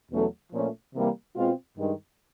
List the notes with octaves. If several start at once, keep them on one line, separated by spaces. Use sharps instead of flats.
E2 B2 F#3 A3 C#4
A#2 F3 A3 C#4
C3 E3 G3 A#3
B2 G#3 C4 F4
G2 D#3 G#3